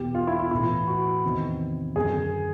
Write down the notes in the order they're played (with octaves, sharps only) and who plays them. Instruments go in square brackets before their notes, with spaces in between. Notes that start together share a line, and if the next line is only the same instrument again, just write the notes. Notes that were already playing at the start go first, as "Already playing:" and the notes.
Already playing: [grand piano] E2 B2 G4
F4
E4
E4
A2 E3 E4
F#4
E2 C3 D#3
F#2 D3 G#4